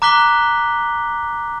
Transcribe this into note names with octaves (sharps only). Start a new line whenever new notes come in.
A#5 D6 F#6 B6 G7